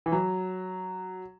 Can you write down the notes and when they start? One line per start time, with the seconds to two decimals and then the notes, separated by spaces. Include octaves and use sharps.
0.06 E3
0.12 F#3